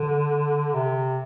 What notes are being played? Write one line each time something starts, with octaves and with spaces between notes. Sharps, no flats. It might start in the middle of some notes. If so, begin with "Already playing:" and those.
Already playing: D3
C3